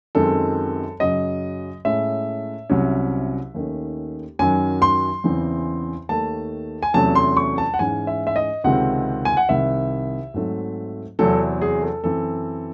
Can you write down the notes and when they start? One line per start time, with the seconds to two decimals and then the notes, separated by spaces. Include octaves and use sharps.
0.15 F#2 D#3 G#3 C4 A4
1.00 F#2 C#3 F#3 D#5
1.85 A2 G#3 C#4 E5
2.70 C2 C3 F#3 C#4
3.54 D#2 D#3 A3 C#4
4.39 F#2 D#3 F#3 C#4 G#5
4.82 C6
5.24 E2 C#3 E3 C4
6.09 D#2 D#3 A3 A5
6.83 G#5
6.94 E2 C3 F#3 A3 C#4 A5
7.15 C6
7.37 C#6
7.58 A5
7.74 F#5
7.79 G#2 E3 G#3 C#4 G#5
8.07 E5
8.27 E5
8.36 D#5
8.64 C#2 C3 D#3 G#3 C4 F#5
9.25 G#5
9.37 F#5
9.49 C2 C3 D#3 E5
10.34 G#2 F#3 A3 C4
11.19 E2 C3 F#3 C4 A4
11.62 G#4
11.83 A4
12.03 F#2 E3 C4 A4